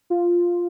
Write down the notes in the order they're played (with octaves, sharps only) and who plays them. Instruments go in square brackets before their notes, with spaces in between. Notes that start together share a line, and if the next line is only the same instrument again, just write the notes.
[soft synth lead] F4